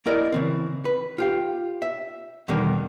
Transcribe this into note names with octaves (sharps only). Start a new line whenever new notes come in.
A#3 E4 A#4 D5 D#5
C#3 E3 C4
B4
F4 G4 F5
E5
E2 B2 D3 D#3 G3 A#3